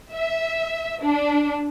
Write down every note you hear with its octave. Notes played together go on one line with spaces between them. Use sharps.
E5
D4